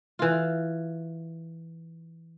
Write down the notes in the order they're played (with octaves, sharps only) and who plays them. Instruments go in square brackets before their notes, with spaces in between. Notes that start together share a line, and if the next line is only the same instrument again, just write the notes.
[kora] E3 F4